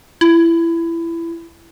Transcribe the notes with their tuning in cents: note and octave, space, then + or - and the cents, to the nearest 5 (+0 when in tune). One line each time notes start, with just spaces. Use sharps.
E4 +20